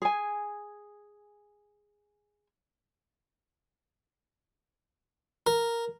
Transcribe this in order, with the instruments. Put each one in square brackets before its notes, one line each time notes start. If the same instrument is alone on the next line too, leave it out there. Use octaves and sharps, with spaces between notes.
[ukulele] G#4 G#5
[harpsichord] A#4